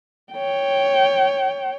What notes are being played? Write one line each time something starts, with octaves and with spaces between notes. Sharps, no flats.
C#5 G5